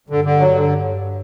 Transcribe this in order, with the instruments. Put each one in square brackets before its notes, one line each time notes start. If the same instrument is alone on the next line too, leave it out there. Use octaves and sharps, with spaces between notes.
[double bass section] G2 [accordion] D3
[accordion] D3
F#3
D3